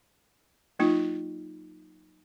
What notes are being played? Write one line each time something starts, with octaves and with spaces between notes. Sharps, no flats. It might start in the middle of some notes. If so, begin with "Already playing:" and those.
F#3 A#3 D#4 F4